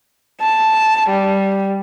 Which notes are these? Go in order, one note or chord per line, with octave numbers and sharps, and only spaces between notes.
A5
G3